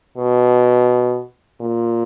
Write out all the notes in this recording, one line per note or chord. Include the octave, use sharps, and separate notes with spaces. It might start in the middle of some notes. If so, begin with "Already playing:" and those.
B2
A#2